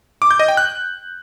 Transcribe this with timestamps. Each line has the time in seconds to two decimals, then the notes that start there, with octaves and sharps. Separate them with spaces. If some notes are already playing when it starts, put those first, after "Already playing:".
0.22 D6
0.31 G6
0.40 D#5
0.48 G5
0.57 F#6